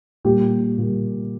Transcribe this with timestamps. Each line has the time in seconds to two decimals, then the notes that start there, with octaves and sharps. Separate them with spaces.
0.24 A#2 G3 A#3 G4
0.78 A#2 G3 A#3